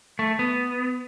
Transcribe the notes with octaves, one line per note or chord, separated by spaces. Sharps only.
A3
B3